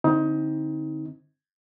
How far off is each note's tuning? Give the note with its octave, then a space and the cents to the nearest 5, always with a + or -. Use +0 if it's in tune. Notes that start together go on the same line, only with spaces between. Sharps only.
D3 -5 C4 +0 D#4 +25